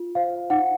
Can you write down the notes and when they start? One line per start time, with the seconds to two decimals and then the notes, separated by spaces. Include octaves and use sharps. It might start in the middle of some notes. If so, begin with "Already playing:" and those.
Already playing: F4
0.15 C5 F5
0.50 D#4 F#5